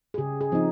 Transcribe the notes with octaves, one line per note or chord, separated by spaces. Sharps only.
G#4
C#3 G4
G#4
F3 C4 D#4